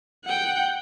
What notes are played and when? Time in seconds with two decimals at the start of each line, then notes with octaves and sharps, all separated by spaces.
0.25 F#5 G5